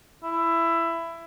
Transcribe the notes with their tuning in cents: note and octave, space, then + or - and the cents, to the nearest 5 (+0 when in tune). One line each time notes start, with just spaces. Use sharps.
E4 +15